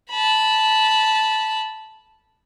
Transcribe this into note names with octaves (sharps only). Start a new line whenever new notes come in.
A5 B5